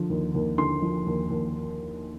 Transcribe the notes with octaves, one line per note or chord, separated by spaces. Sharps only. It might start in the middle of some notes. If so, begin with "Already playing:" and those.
Already playing: D3 F3
D#2
D#2
D3 C6
F3
D#2
D#2